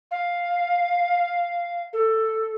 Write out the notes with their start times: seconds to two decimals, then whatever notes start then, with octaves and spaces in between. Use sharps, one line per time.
0.11 F5
1.93 A4